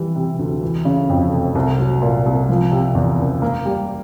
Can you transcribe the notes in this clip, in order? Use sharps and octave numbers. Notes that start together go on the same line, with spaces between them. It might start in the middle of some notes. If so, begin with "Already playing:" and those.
Already playing: E3 G3
C3
D2
E3
C#3
F2
F1
C2
F#3
A#2
C2
F3
C3
E2
F#1
A#3
G3